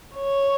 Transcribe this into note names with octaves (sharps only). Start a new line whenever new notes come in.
C#5